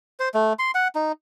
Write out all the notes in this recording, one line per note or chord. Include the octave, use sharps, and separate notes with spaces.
C5
A3
C6
F#5
D#4